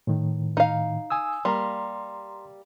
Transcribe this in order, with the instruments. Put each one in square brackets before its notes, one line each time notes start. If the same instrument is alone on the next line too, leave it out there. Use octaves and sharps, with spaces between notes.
[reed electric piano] A2 D#3
[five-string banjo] D#4 F5
[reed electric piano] G#5 D#6 E6
[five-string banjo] G3 A#3 [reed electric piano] A#5 C6